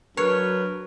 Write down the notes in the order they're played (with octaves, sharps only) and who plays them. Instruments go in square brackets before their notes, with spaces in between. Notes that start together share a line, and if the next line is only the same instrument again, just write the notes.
[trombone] F#3 [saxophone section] D4 A#4 B4 [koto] C#5